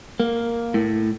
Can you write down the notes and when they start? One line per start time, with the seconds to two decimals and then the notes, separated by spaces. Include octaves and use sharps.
0.20 A#3
0.74 A2